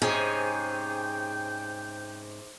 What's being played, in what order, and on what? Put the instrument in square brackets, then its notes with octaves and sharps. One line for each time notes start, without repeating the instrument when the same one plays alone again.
[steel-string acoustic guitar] G#2 C#4 [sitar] C3 G#4 [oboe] G5